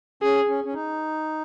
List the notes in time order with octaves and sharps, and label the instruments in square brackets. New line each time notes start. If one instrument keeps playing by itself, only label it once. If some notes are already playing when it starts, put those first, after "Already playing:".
[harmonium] C#4 [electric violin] G#4
[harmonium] C#4
C#4
D#4